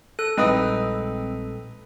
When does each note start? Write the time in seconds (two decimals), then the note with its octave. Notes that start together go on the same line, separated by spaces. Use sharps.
0.19 A4 F#6
0.37 A#1 G3 G#3 C4 D#4 B4 D#6